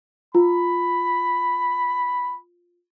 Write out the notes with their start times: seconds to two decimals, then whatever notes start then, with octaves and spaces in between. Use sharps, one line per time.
0.35 F4 B5